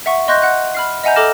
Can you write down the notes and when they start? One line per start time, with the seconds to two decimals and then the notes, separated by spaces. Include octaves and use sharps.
0.06 E5 F#5 C#6
0.28 D#5 C6 C#6 F#6 G6 A#6
0.42 F#5 F#6
0.75 B5 F6 C7
1.03 D#5 E5 F#5 G#5 A#5 G6
1.16 A4 A#5 D6 F6 A#6 E7